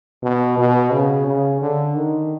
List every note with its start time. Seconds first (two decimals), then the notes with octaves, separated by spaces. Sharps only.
0.23 B2
0.57 B2
0.92 C#3
1.27 C#3
1.61 D3
1.96 D#3